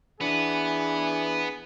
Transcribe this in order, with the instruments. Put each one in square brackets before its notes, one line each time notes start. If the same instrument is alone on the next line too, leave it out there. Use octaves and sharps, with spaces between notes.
[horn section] E3 D4 G#4 [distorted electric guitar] B3